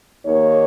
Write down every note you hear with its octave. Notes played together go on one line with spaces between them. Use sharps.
D#2 D#3 A#3 C#5